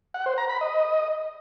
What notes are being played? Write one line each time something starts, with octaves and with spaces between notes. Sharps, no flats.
F#5
C5
A#5
B5
D#5